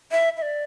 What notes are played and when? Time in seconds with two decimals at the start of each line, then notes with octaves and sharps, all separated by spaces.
0.12 E5
0.37 E5
0.42 D5